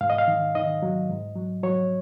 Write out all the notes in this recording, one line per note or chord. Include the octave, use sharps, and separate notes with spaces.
G#2 F5
D#5
F5
D#3
D#3 D#5
F#3
G#2
F#3
F#3 C#5